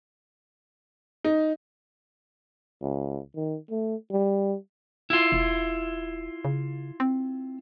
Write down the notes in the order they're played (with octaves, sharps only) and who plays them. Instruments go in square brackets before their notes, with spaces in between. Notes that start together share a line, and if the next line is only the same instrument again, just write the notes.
[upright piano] D#4
[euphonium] C#2
D#3
A3
G3
[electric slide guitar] E4 F4
[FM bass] E1
C#3
C4